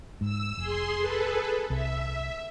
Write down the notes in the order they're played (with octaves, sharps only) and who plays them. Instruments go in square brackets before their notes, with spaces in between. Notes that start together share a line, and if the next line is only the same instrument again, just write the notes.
[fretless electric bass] G#2 [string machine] E6
[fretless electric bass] F1 [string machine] G#4 C6
[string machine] G#4 A4 B4
[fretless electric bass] C2 [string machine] E5